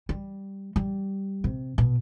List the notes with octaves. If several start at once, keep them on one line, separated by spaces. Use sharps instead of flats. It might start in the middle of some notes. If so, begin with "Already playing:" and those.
G3
G3
C3
B2